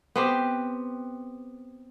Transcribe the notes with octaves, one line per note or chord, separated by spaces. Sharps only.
B3 C4 G4